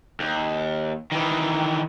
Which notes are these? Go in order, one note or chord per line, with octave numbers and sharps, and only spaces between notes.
D#2
D#3 E3